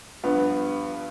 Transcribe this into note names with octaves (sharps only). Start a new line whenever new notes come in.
G2 F3 B3